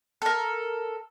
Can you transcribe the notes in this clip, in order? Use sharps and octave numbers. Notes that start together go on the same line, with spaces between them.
A4 A#4